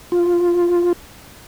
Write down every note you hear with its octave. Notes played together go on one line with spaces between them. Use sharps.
F4